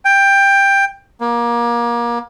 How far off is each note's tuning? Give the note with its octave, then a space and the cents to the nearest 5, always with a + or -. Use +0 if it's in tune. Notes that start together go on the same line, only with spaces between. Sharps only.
G5 +15
A#3 +25